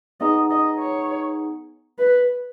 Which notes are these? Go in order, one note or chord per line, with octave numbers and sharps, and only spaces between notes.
B3 D#4 G#4 D#5
D#5
C#5
B4